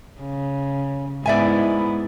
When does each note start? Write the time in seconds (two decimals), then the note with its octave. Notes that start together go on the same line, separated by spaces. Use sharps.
0.21 C#3
1.26 G#2 B3 E4 D5 E5 G#5